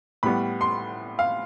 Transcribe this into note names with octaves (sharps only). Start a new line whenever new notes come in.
A2 G3 B3 B5
C6
F5